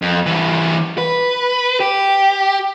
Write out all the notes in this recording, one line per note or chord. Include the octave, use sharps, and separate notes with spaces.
F2
E3 G3
B4
G4